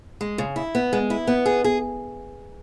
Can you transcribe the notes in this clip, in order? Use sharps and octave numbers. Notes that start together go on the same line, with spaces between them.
G#3
C#3
E4
B3
G#3
E4
B3
G#4
G#4